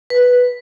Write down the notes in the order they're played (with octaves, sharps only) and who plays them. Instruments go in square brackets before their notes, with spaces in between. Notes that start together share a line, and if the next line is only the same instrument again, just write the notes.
[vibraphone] B4